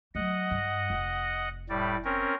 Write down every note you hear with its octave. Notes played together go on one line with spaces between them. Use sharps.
F#3 A3 D#5 F#5
G2
F1
A2 G3 D5
C4 C#4 A#4